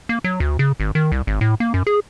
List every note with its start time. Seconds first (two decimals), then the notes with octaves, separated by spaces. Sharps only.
0.09 A#3
0.24 F#3
0.40 D2
0.59 C#3
0.80 G#1
0.95 D#3
1.12 C2
1.27 G#1
1.41 A2
1.60 A#3
1.74 F#2
1.87 G#4